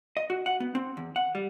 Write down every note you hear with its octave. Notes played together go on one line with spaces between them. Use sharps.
D#5
F#4
F#5
B3
C4
E2
F#5
G3